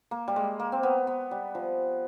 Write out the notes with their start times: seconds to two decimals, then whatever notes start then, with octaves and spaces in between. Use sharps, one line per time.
0.11 A#3
0.28 G3
0.36 G#3
0.60 A#3
0.72 C4
0.83 B3
1.07 B3
1.31 G3
1.55 F3